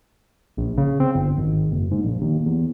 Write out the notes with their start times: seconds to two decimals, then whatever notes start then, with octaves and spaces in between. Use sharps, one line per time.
0.57 A#1
0.78 C#3
1.00 C4
1.15 G1
1.38 G#1
1.72 F#1
1.92 G#2
2.04 A#1
2.22 D#2
2.46 E2